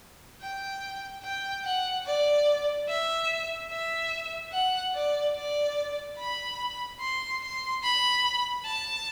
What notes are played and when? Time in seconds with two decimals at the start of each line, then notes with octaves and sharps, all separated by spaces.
0.41 G5
1.23 G5
1.65 F#5
2.06 D5
2.89 E5
3.71 E5
4.53 F#5
4.94 D5
5.36 D5
6.18 B5
7.00 C6
7.42 C6
7.83 B5
8.65 A5